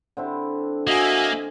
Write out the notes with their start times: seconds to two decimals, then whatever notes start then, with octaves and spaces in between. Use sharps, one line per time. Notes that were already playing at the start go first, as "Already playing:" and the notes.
0.17 D3 C4 E4
0.87 A#3 F#4 D#5 E5 G#5